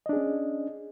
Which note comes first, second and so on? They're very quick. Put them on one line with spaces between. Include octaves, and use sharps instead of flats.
D#5 D4 G#4 C#4